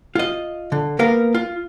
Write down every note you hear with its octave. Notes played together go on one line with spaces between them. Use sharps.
F4 D#5
D3
A#3 B3 A#4 F5
F4